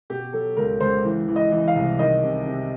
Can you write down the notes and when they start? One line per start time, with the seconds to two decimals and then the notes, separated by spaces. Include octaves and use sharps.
0.10 B2 G4
0.33 F#3 A4
0.57 C#2 A#4
0.81 C#2 C5
1.05 E3
1.28 E3
1.36 D#5
1.52 E3
1.68 F5
1.76 C2
1.99 D#3 D#5
2.23 C3
2.47 C3